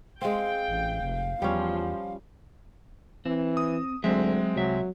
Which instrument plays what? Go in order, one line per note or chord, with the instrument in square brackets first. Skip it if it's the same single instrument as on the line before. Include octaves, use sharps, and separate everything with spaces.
[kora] G#3 C4 [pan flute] F5 [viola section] G5
[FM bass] A1
F1
[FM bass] E2 [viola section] F3 [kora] G3 C#4
[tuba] E3 [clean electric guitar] C4
[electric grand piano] D#6
[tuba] D2 [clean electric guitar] F#3 E5 [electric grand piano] G#3 C4
[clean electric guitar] C2 E5 [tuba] F#3